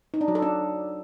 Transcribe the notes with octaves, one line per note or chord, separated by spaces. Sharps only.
D#4
D4
F#3
A4
D4